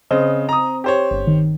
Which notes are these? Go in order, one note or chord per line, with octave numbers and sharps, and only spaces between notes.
C#3 C4 C5 D#5
A#5 D#6
G4 C5 C#5
G1
D#3